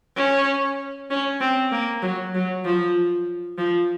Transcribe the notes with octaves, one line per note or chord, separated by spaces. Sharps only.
C#4
C#4
C4
A#3
F#3
F#3
F3
F3